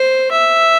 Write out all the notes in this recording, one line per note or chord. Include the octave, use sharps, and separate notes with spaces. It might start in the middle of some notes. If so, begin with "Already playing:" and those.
Already playing: C5
E5